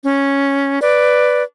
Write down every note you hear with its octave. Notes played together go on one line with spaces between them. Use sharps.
C#4
B4 D5